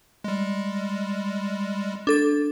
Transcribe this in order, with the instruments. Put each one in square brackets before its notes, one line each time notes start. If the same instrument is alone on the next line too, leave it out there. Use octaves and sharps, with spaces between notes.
[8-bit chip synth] G3 G#3
[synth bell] D4 A4 A6